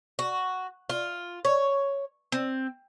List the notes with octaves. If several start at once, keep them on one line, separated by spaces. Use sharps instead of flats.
F#4
F4
C#5
C4